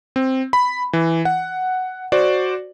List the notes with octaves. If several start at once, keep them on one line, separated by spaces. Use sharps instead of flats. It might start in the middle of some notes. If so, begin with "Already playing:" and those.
C4
B5
E3
F#5
F#4 C5 D5